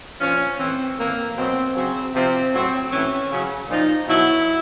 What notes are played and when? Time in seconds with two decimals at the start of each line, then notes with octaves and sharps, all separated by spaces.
0.19 A#2 F3 C#4
0.58 A2 E3 C4
0.97 A2 E3 A#3
1.36 B2 F#3 C4
1.75 C#3 F#3 C4
2.13 C3 F3 C4
2.52 A2 F#3 C4
2.91 A2 E3 C#4
3.30 C#3 F#3
3.68 A#2 F3 D#4
4.07 B2 F#3 E4